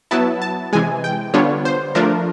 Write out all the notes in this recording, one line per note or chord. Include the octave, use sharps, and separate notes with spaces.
F#3 B3 E4 A5
A5
C3 E3 G#3 G#5
G5
D3 G3 B3 D4 F4 C#5
C5
F3 A3 D4 F4 A#4